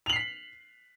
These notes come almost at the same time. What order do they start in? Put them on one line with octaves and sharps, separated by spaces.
F7 F#7 C7 B6